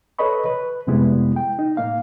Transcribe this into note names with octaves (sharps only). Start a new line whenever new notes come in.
A4 B4 C#5 D#5 B5 C#6
B4
F2 C3 G3 G#3 B3 E4
G5
D#4
A2 A#3 F5